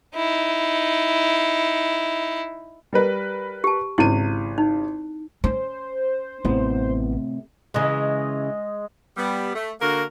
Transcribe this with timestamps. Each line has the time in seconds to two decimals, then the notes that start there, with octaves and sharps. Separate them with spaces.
0.15 D#4 E4
2.93 G3 A#4 B4
3.64 G4 A5
3.98 G#1 C#3 E4 D#7
4.58 D#4
5.44 C#4 C5
6.45 A1 A2 C3 B3 E4
7.74 C#3 E3 G#3 D#5
9.17 G3 B3
9.55 A3
9.81 D3 A#3 F#4 A#4